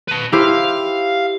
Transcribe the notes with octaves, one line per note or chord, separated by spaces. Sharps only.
B4 A5
E4 G4 C5 F5